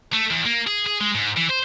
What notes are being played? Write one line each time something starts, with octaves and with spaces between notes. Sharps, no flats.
A3
E2
A#3
G#4
G#4
G#3
G#2
E3
C5